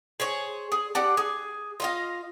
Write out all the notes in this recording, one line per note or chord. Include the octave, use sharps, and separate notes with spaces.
G#4 C5 C#5
G#4
D4 G4 F#5
G#4
F4 D#5 F5